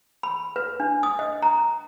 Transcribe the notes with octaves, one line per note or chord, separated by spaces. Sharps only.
B5
B4
D4
D#6
D#5
A#5